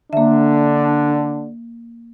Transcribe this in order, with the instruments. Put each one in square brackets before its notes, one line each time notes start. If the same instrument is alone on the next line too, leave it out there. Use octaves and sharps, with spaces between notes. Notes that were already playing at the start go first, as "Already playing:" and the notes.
[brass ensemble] D3 D4 [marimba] A#3 E5